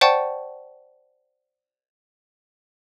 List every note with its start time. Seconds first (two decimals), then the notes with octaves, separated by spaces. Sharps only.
0.01 C5 D5 F#5 G5 A5 C#6